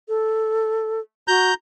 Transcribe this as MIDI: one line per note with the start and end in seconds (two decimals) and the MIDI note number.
0.09 1.00 69
1.28 1.52 66
1.28 1.54 82
1.28 1.54 91